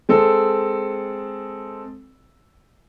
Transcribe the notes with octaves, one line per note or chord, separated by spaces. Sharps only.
G#3 C4 A4